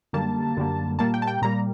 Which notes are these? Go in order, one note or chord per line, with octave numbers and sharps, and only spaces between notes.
F#2 D3 G3 A#3 A5
F#2 D3 G3 A#3
A#2 G3 A#3 A5
G5
A5
G5
A#2 G3 A#3 A#5